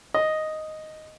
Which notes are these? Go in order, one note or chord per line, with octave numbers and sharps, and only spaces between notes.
D#5